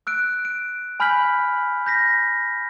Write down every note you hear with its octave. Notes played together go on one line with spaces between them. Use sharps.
E6 F#6 D7
D7
G#5 B5 F6 G6 B6 F#7
G6 A#6 B6